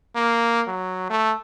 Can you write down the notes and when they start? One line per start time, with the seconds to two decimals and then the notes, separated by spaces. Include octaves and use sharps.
0.16 A#3
0.68 F#3
1.10 A3